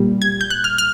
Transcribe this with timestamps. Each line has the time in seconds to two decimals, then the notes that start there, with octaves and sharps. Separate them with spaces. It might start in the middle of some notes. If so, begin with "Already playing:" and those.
Already playing: A#2 G3
0.22 G#6
0.41 G6
0.50 F#6
0.64 F6
0.78 F6